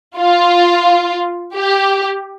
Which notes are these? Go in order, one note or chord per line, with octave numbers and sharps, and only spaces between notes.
F4
G4